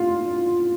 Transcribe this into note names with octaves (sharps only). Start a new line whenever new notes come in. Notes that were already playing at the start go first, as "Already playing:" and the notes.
Already playing: F4